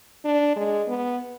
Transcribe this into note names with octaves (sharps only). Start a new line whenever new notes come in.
D4
G#3
B3